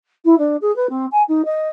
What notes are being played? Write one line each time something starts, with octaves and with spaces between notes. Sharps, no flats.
E4
D4
G#4
B4
C4
G#5
D#4
D#5